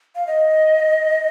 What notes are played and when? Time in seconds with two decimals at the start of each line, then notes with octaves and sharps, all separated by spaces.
0.15 F5
0.27 D#5